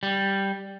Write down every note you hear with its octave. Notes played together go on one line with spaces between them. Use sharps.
G3